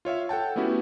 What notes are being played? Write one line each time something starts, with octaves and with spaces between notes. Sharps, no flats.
F4 C#5 E5 F5
A4 F#5 G5 A5
A3 B3 C#4 E4 F#4 G4